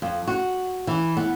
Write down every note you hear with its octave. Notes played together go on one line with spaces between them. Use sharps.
F2
F#4
E3
B3